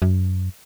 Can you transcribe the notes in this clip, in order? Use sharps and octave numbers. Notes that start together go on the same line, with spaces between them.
F#2